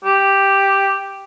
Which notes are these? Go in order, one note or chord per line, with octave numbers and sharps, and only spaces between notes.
G4